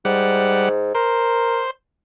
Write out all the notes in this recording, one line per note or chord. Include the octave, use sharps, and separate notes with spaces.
G#2 G3 F#5
A#4 C5